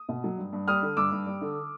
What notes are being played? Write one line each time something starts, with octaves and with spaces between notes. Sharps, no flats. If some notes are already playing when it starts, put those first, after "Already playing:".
Already playing: D#6
B2
F#3
G2
G2
G3 D#6 F6
D3
G2 D6 E6
G2
G3
D3